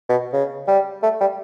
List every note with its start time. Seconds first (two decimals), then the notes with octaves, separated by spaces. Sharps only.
0.09 B2
0.33 C#3
0.67 G3
1.03 A3
1.21 G3